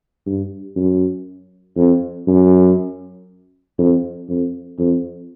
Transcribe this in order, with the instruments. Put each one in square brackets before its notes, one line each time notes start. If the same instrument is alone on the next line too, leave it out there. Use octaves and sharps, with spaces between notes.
[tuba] G2
F#2
F2
F#2
F2
F2
F2